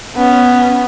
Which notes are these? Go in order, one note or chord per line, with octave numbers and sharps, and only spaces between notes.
B3 C#4